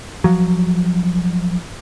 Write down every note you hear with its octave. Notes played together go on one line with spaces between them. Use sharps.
F3 F#3